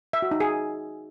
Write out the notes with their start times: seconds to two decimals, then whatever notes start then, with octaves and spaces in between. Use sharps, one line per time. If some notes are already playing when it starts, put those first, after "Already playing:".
0.13 E5
0.22 F#4
0.31 D#4
0.40 G#4